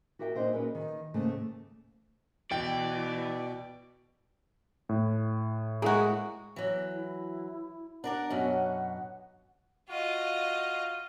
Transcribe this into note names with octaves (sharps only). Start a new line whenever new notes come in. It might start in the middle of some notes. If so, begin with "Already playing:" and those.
F#4 G4 A#4 E5 F#5 G5
A#2 D4 D#4 C5 D#5
C#4 F#4 G#4 A#4 B4
D#3
D#2 G#2 C#3 A3 A5
B2 E3 D5 G5
A2
G#3 A#3 E4 F#4 G#4
E3 F#3
E4
D4 A#4 D5 F#5
F#2 B2 C#4
F4 F#4 D#5 F5